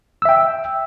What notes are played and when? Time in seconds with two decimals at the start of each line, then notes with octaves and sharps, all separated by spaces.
0.22 E6
0.25 E5
0.29 G5